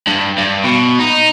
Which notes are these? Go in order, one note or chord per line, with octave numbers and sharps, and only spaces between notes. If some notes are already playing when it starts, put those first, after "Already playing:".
G2
G2
B2
D#4